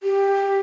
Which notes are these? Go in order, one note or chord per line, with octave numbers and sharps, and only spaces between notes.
G4